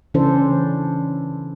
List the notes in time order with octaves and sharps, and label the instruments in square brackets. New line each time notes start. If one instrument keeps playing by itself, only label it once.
[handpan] C#3 E3 C#4 D4 A4 C5